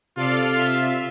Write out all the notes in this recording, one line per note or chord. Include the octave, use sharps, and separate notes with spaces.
C3 F4 A4 D5 F5
E5